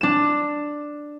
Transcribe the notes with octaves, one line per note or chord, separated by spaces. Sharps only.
D4 E7